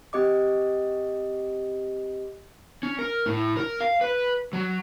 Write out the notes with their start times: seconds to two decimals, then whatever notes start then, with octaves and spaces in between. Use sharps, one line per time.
0.13 C4 G4 D#5 D6
2.83 C#4
2.99 A#4
3.26 A2
3.57 A#4
3.80 F5
4.01 B4
4.53 F#3